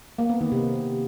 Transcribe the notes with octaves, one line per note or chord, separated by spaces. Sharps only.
A#3
B3
D#3
C3